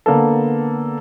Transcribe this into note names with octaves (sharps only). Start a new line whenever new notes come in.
D3 A#3 B3 A4